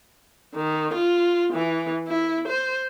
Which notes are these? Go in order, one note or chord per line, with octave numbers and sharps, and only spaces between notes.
D#3
F4
E3
E4
C5